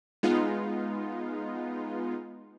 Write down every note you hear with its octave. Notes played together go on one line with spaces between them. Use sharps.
G#3 B3 D#4 F4